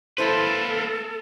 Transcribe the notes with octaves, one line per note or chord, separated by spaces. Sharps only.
A#3 E4 A4 B4 C5